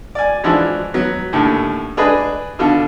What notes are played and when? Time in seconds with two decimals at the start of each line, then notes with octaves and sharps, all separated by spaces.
0.15 D5 G#5
0.44 E3 F3 G#3 D4 E4 F#4
0.94 F#3 B3
1.33 D#2 A2 D3
1.97 D4 G#4 B4 D#5
2.59 B2 D3 F4